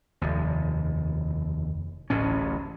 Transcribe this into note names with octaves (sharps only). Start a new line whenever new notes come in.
F1 D#2
D1 A1 A2 C#4